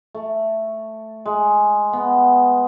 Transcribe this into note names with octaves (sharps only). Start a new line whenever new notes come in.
A3
G#3
B3